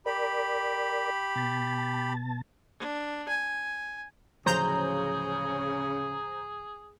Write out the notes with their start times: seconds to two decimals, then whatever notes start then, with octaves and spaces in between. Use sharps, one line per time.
0.06 G4 A#4 D5 B5
1.36 B2 A5
2.79 D4
3.28 G#5
4.46 D1 C#3 F3 F#3 G#4 C5 A#5 G6